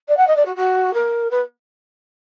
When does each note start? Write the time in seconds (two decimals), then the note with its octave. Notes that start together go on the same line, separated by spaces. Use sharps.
0.08 D5
0.17 F#5
0.27 D#5
0.36 D5
0.46 F#4
0.56 F#4
0.94 A#4
1.31 B4